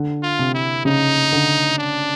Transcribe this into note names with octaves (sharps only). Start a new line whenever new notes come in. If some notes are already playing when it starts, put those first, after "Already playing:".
Already playing: D3
F4
C3
E4
C#3 D#4
D3
D4